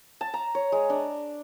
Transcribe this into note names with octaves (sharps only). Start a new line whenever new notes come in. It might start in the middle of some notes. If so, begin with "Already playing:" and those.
A5
A#5
C#5
G#3
D4